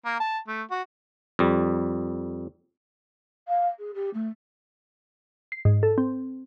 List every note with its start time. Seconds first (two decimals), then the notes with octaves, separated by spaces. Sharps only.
0.05 A#3
0.20 A5
0.47 A3
0.71 F#4
1.39 F2 G3
3.48 F5
3.78 G#4
3.94 G4
4.13 A3
5.52 C7
5.65 G#2
5.83 A4
5.98 C4